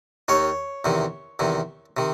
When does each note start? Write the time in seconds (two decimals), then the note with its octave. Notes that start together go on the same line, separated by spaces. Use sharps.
0.28 D#2 D#3 C#5
0.85 E2 C3 D#3
1.39 E2 C3 D#3
1.97 C3 D#3